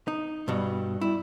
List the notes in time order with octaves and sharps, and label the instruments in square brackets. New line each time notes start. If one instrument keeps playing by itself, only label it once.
[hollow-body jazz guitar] D#4
[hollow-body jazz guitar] G2 B2 [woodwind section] G3
[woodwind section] G3 [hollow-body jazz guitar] E4